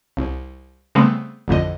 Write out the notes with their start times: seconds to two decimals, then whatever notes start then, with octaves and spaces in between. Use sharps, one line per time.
0.17 C2
0.95 C#3 G3 A3 B3 C4
1.48 A1 F2 D3 D#5